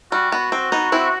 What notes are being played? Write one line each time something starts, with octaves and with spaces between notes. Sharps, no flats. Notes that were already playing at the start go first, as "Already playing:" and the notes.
G3 F#4
B3 F#4
C4
B3 D#4
C4 E4